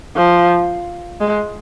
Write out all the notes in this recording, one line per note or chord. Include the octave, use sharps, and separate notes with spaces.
F3
G#3